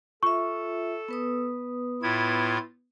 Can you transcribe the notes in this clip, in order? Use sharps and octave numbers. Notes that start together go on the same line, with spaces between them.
F4 A4 E5 C#6
B3 B4 D#6
A2 E4 F4 G#6